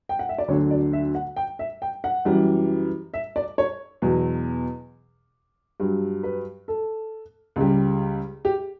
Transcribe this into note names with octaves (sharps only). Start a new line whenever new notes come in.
G5
F#5
E5
D5
D2 D3 F#3 C#5
D5
E5
F#5
G5
E5
G5
F#5
F#2 E3 G3
E5
D5
C#5
E2 B2 F#3
G2 F#3
B4
A4
C#2 C#3 G3
G4